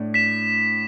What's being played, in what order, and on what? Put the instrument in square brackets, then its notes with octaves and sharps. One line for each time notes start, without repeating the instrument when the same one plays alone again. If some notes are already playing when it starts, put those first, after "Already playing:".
Already playing: [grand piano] A2 A3 D4
[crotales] B6 E7